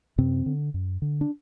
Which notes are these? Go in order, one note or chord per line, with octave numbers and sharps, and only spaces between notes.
F#2 C3 C4
D3
F#2
D3
D4